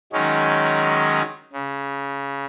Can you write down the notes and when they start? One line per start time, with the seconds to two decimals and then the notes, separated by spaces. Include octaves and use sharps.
0.13 D#3 F#3 G#3 C#4 D#4
1.53 C#3